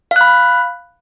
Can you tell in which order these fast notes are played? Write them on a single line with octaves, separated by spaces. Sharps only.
F5 F#6 B5